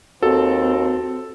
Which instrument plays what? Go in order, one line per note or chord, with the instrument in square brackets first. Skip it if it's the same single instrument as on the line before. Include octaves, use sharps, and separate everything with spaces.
[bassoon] D#2 [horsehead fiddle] C4 [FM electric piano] F#4 [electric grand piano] A4